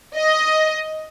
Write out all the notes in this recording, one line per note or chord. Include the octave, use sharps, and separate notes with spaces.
D#5